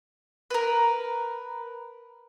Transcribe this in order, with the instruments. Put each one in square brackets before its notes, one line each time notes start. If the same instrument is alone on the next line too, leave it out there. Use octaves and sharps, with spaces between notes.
[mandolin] A#4 B4